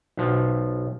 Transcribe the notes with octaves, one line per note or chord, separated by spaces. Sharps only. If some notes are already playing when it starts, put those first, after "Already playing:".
B1 F3